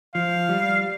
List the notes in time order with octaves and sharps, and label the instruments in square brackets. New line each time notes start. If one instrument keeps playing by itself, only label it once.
[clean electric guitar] F3 [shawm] F5
[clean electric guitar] G3